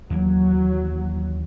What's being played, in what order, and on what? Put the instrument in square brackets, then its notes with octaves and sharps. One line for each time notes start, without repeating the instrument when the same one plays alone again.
[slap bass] D#2 E3 A#3 [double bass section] F#3